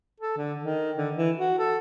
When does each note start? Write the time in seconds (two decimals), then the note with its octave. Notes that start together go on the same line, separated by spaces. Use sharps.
0.20 A4
0.37 D3
0.61 D#3
0.96 D3
1.16 E3
1.37 F#4
1.59 A4